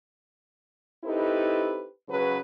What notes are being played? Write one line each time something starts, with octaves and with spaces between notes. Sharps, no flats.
C4 D#4 E4 G4 A4 B4
C#3 F#3 B4